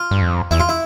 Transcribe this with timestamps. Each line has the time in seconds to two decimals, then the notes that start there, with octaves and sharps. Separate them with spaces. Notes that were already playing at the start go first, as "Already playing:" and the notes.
Already playing: F4
0.11 G2
0.22 F2
0.51 E2 E4
0.60 F4
0.69 E4